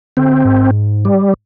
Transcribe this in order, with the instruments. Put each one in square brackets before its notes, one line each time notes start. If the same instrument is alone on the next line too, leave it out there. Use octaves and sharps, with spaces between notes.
[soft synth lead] D3 [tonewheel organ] C4
[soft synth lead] G#2
[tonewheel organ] G3